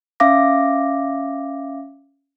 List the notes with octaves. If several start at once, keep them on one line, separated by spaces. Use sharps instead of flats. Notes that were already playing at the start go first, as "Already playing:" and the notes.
C#4 E5 F5 D6 A#6